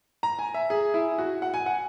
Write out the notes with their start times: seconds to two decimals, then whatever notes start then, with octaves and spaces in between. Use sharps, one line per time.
0.23 A#5
0.39 G#5
0.54 E5
0.70 G#4
0.94 E4
1.18 F#4
1.42 F#5
1.54 G#5
1.66 F#5